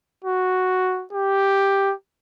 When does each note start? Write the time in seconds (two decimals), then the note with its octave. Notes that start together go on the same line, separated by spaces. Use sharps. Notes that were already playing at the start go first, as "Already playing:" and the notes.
0.25 F#4
1.13 G4